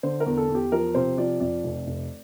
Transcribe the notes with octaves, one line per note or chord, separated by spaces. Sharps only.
D3 C5
A#4
E2
A4
E2
G4
F3 A#4
C3 C5
F3 D5
F2 D5
F1
F1